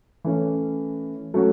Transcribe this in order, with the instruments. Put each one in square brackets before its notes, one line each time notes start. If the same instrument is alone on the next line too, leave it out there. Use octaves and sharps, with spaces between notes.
[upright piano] E3 A3 C#4
F#3 A3 C#4 F#4